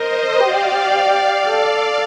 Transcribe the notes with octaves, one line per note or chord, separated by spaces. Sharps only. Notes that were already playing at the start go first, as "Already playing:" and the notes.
Already playing: A#4 C5 D#5
G4 D5 F5
A4 D5 F5